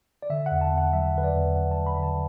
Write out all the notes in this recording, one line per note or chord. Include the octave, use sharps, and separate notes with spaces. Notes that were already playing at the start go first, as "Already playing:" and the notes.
D5
D3 E5
F#5
E2
A5
E2
F#5
F#3 E5
D3 B4
D5
E2
E2 F#5
A5
F#3
B5
D3 A5